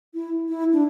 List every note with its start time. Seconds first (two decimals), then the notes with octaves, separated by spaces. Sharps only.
0.14 E4
0.48 E4
0.73 D4